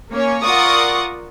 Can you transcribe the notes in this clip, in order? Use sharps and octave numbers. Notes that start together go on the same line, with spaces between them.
A#3 C#4 C#5
F4 A#4 D5 F#5 C#6 D#6